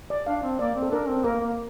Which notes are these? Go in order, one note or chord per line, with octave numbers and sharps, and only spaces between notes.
D5
D4 F5
C4
A#3 D5
C4
A4
D4 A#4
C4
A#3 A#4
A#3